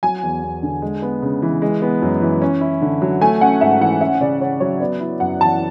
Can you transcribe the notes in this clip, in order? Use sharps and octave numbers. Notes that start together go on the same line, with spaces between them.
F#3 G#5
E2
E2
D3
G#3
B3
C#3
E3
G#3
B3
F#2
E3
C#4
E4
D3
F#3
A3 G#5
C#4 F#5
G#2 E5
E3 F#5
C#4 E5
C#3 D5
C#3 C#5
F#3 C#5
B3 D5
E4
F#2 F#5
E3 A5